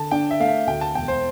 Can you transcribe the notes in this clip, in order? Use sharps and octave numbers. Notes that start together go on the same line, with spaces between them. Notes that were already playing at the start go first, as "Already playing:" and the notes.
Already playing: D3 A5
D4 G5
E5
A3 F5
E5
D2 G5
A5
E1 G5
C5